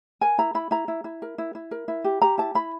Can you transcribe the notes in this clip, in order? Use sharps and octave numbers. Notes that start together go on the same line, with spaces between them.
A#4 G#5
E4 A#5
E4 B5
E4 A#5
E4
E4
A#4
E4
E4
A#4
E4
G4
G4 A#5
E4 A5
E4 B5